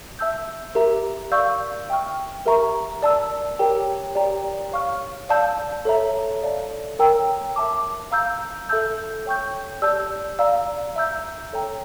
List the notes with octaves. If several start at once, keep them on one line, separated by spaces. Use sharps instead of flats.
E5 A5 E6 G6
G4 A#4 E5 A#5
D5 F5 C#6 E6 G6
E5 G5 C#6 F6
G4 A#4 E5 A#5 C#6
D5 A5 E6
G4 A#4 C#5 G5 A#5
G4 D5 G5 A#5
C#5 F5 C#6 F6
D5 F5 A5 E6 G6
A4 C#5 E5 A#5
A4 D5 F5 A5
A#4 C#5 G5 A#5 E6
E5 A5 D6
F5 A#5 E6 G6
A4 E5 A5 E6 G6
C#5 G5 C#6 G6
G4 D5 A5 E6 G6
D5 F5 A#5 E6
E5 A#5 E6 G6
A4 C#5 G5 A#5